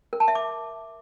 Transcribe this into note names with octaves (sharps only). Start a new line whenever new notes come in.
A#4
A5
E5
D6